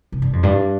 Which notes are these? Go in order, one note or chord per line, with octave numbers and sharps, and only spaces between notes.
C3
G2
F2
G2